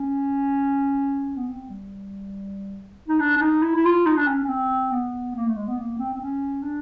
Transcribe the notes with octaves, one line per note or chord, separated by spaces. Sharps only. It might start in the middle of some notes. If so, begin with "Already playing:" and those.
Already playing: C#4
B3
C4
G3
D#4
D4
D4
D#4
E4
E4
F4
D#4
D4
C#4
C#4
C4
B3
A#3
A3
G#3
B3
A#3
C4
C4
C#4
D4